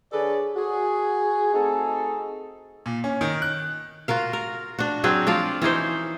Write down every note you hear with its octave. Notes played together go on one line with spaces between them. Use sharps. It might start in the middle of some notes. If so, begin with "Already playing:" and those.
D3 G#4 A4 B4 C#5 D5
F#4 G#4
A3 C4 D#4 F#4 G#4 A4
A#2
C#4
D#3
F#6
F4 F#4 A#4 F5
A#4
D4 F#4
F#3 C4 F#4 G#4
F3 F4 D5 F5
E3 C#4 D#4 C5